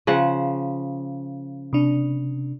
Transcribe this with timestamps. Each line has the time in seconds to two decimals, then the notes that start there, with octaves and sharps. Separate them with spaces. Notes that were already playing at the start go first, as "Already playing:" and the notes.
0.07 C#3 F3 F#5
1.73 C3 D4